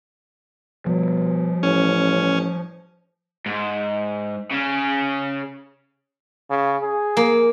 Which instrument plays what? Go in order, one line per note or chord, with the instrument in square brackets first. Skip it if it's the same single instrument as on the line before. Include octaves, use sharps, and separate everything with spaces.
[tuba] B2 [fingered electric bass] F3 G3
[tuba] A1 [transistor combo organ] C#4
[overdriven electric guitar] G#2
C#3 C#4
[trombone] C#3
G#4
[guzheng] A#3